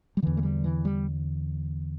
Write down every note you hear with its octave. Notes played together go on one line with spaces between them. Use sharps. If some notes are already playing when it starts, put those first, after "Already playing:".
G3
E2 D3 E3
A3
G3
E3
G3